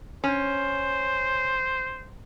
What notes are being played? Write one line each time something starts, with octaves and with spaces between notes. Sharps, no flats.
C#4 C5